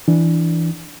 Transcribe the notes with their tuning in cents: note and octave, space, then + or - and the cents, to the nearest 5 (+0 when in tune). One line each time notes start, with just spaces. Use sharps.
E3 +0 D4 +0